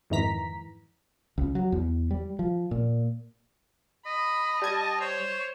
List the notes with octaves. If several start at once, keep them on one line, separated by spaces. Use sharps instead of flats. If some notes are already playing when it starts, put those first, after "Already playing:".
F2 G#2 D#3 E3 A#5 B6
C#2
F#3
E2
G3
F3
A#2
D#5 B5
G3 A5 G#6
C5 C#5